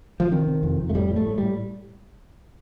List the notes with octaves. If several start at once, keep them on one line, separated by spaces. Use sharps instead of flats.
F3
C3 D#3
C3
F2
F2
A3
A2 G3
A2
A3
A2
G3
A2